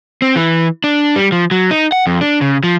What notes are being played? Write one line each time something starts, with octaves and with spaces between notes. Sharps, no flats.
C4
E3
D4
G3
F3
F#3
D#4
F#5
F2
D4
C#3
F3